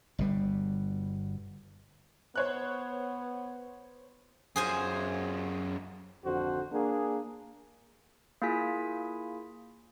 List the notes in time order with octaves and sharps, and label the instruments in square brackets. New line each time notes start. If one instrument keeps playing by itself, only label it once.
[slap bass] G1 B2 G3
[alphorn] B3 [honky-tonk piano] C5 C#5 F#6
[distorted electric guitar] F#2 F4 [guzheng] G#4 C5 G#5
[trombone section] G#1 F2 D3 F3 F#4 C5
A#3 D4 G#4
[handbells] A#3 E4 F4 G#4 G#5 B6